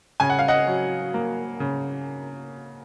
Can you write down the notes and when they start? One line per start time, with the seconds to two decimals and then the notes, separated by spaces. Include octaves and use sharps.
0.20 C#3 G#5
0.30 F#5
0.39 F5
0.48 D#5 F#5
0.67 F#3
1.14 A#3
1.60 C#3